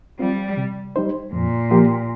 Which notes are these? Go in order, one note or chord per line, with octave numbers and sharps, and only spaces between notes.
G3 C4 F4
C3
G3 D#4 C5
F2 A#2
F3 A#3 G4